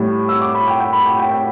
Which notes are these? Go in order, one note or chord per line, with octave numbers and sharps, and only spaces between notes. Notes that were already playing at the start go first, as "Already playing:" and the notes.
Already playing: A2 G3
E6
D6
B5
G5
G5
B5
G5
G5
G5